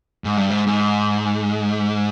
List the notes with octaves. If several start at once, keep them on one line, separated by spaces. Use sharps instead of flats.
G#2
G2
G#2
G#2